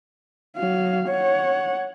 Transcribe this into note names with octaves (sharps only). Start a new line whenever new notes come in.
F#3 F5
C#5 F#5